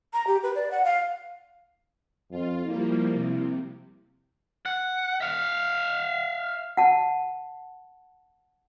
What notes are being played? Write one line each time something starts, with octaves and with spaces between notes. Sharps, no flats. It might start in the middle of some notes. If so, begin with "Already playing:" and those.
A#5
G4
B4
D5
F#5
F5
F2 F4
F3 G3 A#3 E4
C3
F#5
E5 F5
F#5 A5